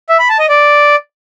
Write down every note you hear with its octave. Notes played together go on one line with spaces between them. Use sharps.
E5
B5
A5
D#5
D5